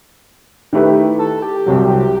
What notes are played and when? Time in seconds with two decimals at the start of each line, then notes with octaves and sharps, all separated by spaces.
0.73 D#3 A3 E4 G4 B4
1.19 A4
1.42 G4
1.66 C2 C3 F#3